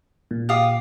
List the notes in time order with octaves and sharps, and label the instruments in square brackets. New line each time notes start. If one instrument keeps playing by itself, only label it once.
[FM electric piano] A#2
[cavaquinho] G4 F5 D#6